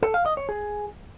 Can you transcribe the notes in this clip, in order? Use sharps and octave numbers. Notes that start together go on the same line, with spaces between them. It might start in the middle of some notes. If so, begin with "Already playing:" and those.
A4
F5
D#5
C#5
G#4